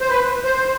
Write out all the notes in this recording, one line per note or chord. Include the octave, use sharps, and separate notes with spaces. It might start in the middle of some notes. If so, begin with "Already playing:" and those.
C5
B4
C5